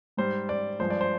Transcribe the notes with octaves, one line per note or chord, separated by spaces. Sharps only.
G#2 G3 C5
D5
G2 F3 G#3 C5
D5
C5